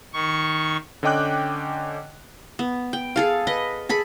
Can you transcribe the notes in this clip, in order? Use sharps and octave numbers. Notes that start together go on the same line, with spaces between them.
D#3 C#6
D3 C#4 D#5 G5 D6 F#6
B3
G5
G#4 A4 F5
B4 D#5
G#4 A4 B5